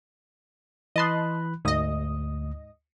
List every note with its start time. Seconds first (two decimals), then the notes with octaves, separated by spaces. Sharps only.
0.96 E3 D#5 A5 B5 C6 F#6
1.65 D2 G#2 D#5 D#6